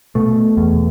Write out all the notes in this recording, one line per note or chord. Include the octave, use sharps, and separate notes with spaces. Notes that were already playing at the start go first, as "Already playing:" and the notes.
B2 A3
E2